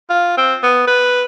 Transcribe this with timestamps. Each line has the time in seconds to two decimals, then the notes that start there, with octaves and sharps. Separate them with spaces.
0.10 F4
0.37 C4
0.63 B3
0.87 B4